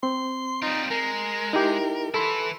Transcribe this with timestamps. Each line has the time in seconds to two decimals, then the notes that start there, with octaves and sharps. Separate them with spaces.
0.03 C4 C6
0.62 G3 D#4 F4
0.91 G#3 A#4
1.53 D#4 E4 G4
2.14 E3 E4 A4 B5 C6